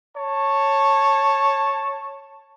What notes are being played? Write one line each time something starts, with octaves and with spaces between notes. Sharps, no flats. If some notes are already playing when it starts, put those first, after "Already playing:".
C#5 A5